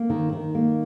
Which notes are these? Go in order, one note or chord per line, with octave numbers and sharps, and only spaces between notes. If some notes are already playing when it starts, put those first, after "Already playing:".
Already playing: A#3
D#3
D#3
A#3